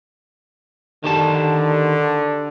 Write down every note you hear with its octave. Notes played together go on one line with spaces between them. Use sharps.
D3 D#3 G4 A5